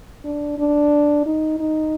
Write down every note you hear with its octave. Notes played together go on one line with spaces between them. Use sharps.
D4
D4
D#4
D#4